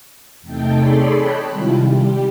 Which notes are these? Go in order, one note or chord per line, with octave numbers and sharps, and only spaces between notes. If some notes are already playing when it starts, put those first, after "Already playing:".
E2 C3 A3 D#4 A4 G5
G#4 A4 C#5 D5 B5 C6
C#5 D#5 G5 A5 B5 F#6
C3 D#3 G3 G#3 E4 F4
G3 G4